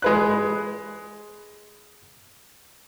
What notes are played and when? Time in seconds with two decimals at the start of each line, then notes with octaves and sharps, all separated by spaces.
0.02 G#3 B4 F#6